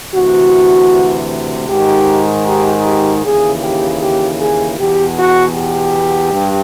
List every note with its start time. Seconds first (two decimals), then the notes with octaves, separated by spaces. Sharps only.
0.14 D2 C3 E3 F#4
1.69 G#2 D#3 G4
2.46 G4
2.85 G4
3.24 D#2 C#3 E3 G#4
3.62 G4
4.01 G4
4.40 G#4
4.78 E2 B2 G4
5.17 F#4
5.55 G4
6.33 G2